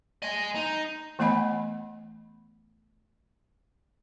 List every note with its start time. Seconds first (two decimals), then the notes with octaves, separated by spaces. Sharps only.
0.22 D#5 G#5
0.55 D#4
1.19 E3 A3 B3 D#5 F#5 B5